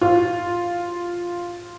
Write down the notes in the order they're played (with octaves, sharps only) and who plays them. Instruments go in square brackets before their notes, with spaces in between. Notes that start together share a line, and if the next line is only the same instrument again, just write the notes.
[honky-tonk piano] F4